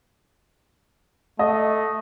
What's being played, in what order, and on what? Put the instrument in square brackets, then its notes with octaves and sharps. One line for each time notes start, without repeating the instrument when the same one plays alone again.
[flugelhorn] A3 [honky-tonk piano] D#5